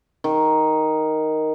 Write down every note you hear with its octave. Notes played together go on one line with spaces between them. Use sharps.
D#3